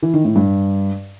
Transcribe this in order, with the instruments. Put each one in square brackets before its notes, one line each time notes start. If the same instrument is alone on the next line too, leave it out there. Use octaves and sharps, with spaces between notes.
[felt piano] E3
D#3
A2
G2